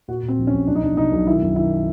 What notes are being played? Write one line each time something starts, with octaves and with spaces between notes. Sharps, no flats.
A#2 F#4
A#2
C4
A#1
C#4
A#1
B1 D4
D#4
B1 D4
B2 D#4
B1
D#3 E4
F#2
D#3 E4